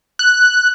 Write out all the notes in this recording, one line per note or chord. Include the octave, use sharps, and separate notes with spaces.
F#6